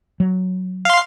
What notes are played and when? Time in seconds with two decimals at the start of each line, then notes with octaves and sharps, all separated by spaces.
0.20 F#3
0.85 F5 C6